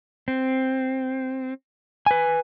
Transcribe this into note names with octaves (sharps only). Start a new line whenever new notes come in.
C4
B4 G#5